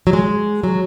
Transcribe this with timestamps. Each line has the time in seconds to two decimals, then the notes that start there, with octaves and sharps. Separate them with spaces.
0.07 F#3
0.13 G#3
0.63 F#3